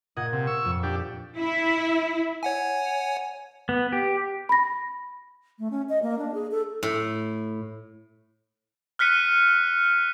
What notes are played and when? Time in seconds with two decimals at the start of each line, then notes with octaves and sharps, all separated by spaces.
0.17 A#2 D#5 F#5 G#6
0.32 C3
0.47 C#6 E6
0.65 F2
0.83 D4 G4
1.39 E4
2.43 C#5 F#5 G#5
3.69 B3
3.93 G4
4.49 B5 A#6
5.59 A3
5.71 C#4
5.89 D#5
6.02 A#3
6.18 D4
6.34 G#4
6.51 A4
6.83 A2
8.99 F6 F#6 B6 C#7 D#7